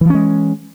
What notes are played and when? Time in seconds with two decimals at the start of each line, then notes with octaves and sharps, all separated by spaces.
0.01 E3
0.05 F3
0.10 C#4
0.14 G#3